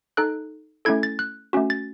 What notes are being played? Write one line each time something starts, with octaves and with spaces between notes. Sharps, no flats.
D#4 A4 F#6
A3 C#4 E4 A4 G#6
A6
F#6
A3 C#4 F#4
A6